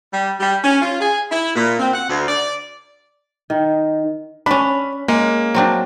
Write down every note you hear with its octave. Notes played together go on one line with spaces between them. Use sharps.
G3
G3
C#4
F4
G#4
E4
A#2
C4
F#5
D2
D5
D#3
C#4 D4 B5
G#3 A#3
F#3 C4 D4